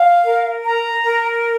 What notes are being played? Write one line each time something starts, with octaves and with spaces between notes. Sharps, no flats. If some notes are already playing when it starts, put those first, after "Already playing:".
Already playing: F5
A#4
A#5
A#4